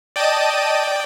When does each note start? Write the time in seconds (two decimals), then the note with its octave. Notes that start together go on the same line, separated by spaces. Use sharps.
0.16 D5 D#5 G5 A5 D#7